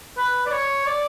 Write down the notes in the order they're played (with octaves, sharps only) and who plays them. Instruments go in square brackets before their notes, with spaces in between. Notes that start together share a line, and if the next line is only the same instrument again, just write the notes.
[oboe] B4
D5
C#5
D5